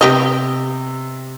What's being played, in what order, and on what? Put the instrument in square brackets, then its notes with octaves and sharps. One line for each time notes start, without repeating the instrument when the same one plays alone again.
[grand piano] C3 [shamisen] B3 G4 D#5